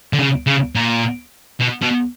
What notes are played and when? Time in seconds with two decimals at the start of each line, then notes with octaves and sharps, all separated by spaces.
0.13 D3
0.19 C#3
0.47 C#3
0.75 A#2
1.60 B2
1.82 B2